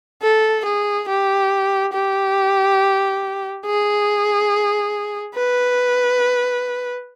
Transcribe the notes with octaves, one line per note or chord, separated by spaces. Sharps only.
A4
G#4
G4
G4
G#4
B4